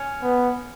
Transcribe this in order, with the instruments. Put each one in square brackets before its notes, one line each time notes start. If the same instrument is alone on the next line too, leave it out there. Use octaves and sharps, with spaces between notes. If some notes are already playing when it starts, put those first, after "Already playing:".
Already playing: [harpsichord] C#4
[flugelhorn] B3